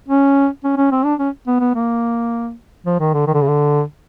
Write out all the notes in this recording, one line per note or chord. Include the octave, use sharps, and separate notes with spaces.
C#4
C#4
C#4
C4
D4
C#4
B3
B3
A#3
F3
D#3
D3
D#3
D3
C#3
D3